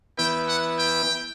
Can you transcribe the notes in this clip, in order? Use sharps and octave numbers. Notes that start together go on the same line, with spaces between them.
E3 B3 E4 B4 G5
F#5
G5